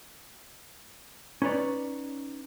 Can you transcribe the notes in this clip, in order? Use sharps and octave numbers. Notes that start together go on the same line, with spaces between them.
C#4 D#4 B4 C#5 D5